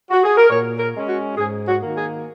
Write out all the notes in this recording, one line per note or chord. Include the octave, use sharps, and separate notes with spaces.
F#4
G#4
A#4
A#2 C#5
A#4
G#3 C#4
F#4
G#2 G#4
F#4
D#3 A#3
G#4